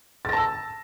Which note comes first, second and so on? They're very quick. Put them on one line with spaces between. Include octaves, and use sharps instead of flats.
A6 A#6 A5 E6